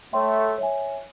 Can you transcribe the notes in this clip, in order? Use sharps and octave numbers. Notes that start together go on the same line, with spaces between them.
A3 C#5 E5 G5 C6
C#5 E5 G#5